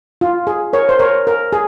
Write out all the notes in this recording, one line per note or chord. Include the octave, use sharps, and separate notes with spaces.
F4
G#4
A#4 C#5
C5
A#4 C#5
A#4
G#4